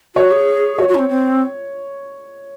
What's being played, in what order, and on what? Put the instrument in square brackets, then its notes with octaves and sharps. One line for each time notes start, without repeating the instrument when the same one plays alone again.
[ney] F#4 [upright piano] C#5
[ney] G#4
[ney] F#4 [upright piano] C#5
[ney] F#4
C#4
C4
C4